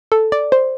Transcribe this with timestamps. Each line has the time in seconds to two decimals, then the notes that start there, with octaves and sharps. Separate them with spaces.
0.12 A4
0.32 D5
0.52 C5